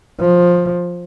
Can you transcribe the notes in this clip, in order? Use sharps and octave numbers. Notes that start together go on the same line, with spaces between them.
F3